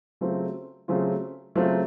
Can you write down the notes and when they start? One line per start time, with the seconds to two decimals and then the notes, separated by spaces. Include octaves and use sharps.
0.21 C#3 F#3 A3 C4 F4
0.88 C#3 F#3 A3 C4 F4
1.55 C#3 F#3 A3 C4 F4